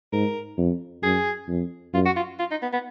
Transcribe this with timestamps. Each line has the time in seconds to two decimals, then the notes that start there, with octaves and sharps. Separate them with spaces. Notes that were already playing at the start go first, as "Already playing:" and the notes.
0.13 G#2 A#4
0.58 F2
1.03 F#2 G#4
1.48 F2
1.93 F#2 F4
2.06 F#4
2.16 F4
2.39 F4
2.51 D#4
2.62 B3
2.73 B3